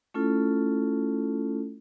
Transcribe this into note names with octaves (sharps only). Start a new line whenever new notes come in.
A3 C#4 E4 F4 A4